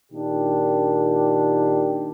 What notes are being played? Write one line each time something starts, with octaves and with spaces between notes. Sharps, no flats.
A#2 D#3 D4 G4